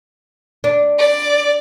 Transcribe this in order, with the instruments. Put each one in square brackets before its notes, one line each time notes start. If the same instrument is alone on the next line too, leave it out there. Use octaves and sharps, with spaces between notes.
[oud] D4
[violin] D5